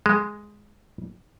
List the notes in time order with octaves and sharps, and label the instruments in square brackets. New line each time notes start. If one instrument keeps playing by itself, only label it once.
[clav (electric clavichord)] G#3